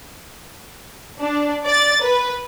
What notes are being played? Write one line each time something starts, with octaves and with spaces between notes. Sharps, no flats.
D4
D5 A6
B4